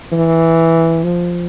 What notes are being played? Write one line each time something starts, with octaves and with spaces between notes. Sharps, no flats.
E3
F3